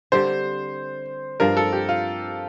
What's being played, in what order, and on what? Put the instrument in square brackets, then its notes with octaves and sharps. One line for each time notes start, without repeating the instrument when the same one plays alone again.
[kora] D3 G3 C4 G4 [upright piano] C5
[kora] G2 F3 C4 [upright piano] A#4
[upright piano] A4
G4
F4